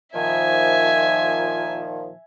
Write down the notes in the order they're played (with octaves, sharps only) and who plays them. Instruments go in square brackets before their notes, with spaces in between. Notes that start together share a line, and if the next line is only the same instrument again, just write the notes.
[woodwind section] A#2 D#3 F3 [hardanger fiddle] E5 G#5